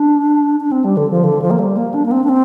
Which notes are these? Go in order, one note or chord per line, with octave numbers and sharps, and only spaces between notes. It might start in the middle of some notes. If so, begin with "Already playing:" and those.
Already playing: D4
D4
C4
G3
D3
F3
D3
F3
A#3
G3
A#3
D4
A#3
C4
D4
C4